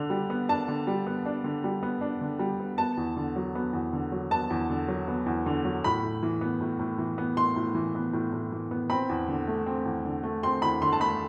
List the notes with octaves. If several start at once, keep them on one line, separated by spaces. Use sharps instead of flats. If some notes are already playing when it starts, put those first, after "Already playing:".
Already playing: D3 D4
G3
B3
D4 A5
D3
G3
B3
D4
D3
G3
B3
D4
D3
G3
B3
B3 A5
E2
D3
F#3
B3
E2
D3
F#3
B3 A5
E2
D3
F#3
B3
E2
D3
F#3
A2 B5
A2
E3
B3
A2
A2
E3
B3
A2 C6
A2
E3
B3
A2
A2
E3
B3
C4 B5
E2
D3
A3
C4
E2
D3
A3
C4 C6
E2 B5
D3 C6
A5
A3 B5